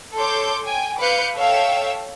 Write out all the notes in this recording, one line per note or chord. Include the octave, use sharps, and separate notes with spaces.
A4 C#5 C6 D6 G6
G5 G#5
B4 F5 D6 F#6 G6 C#7
A4 C#5 E5 F5 G5 E6